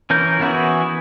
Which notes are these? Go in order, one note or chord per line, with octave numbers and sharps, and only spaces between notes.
E3 C#4 A#4 G6
E3 B3 E4 F#4 G#4